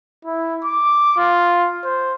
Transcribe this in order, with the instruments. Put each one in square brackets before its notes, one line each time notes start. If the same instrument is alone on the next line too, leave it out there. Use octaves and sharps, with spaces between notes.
[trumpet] E4
D6
F4
C5